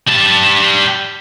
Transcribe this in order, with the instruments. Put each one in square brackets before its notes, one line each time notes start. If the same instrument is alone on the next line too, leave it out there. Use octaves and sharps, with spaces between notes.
[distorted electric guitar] G3 A5